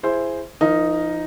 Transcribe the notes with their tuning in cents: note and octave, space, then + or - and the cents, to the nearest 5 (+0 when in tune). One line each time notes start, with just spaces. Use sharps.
E4 +20 G#4 +0 C5 +0
F3 -40 D#4 +0 A#4 +0